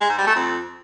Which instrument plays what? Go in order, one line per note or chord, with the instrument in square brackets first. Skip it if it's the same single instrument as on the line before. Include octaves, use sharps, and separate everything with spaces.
[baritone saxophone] G#3
G#2
G3
A3
F2